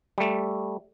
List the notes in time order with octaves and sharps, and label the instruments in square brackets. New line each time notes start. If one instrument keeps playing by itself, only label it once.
[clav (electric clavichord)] G3 A3